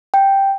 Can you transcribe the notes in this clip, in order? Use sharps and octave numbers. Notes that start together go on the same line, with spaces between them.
G5